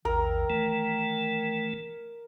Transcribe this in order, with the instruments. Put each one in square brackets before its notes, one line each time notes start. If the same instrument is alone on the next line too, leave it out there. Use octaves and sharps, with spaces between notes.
[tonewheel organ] A#1 E2 [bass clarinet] D#3 [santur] A#4
[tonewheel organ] E3 A3